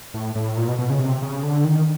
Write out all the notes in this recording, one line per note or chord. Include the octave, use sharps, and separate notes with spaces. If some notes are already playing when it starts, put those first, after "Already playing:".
A2
A2
A#2
B2
B2
C#3
C3
C#3
D3
D#3